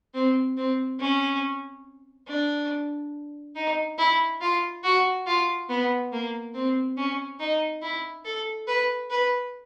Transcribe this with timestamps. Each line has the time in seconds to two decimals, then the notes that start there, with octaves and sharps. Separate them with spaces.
0.14 C4
0.57 C4
1.00 C#4
2.28 D4
3.56 D#4
3.98 E4
4.41 F4
4.84 F#4
5.26 F4
5.69 B3
6.12 A#3
6.54 C4
6.97 C#4
7.40 D#4
7.82 E4
8.25 A4
8.67 B4
9.11 B4